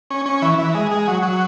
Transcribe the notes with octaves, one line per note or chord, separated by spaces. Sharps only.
C#4
C#4
E3
E3
G#3
G#3
F#3
F#3